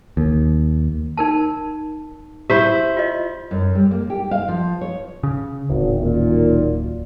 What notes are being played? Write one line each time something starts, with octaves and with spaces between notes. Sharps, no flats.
D#2
D#4 A#4 A5
E4 G4 C5 E5
F4 D#5
F#2
G3
A#3
G4
F5
F3
C#5
C#3
D1 G#1
F#2 A#2 D#3